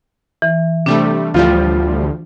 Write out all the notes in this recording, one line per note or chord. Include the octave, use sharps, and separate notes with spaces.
E3
C3 G3 A3 D4
D2 A2 F3 G3 F4